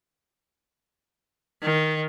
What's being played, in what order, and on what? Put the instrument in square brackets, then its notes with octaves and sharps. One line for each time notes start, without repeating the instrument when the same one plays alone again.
[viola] D#3